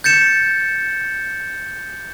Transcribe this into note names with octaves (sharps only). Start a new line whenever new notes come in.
G6 A6 C#7 E7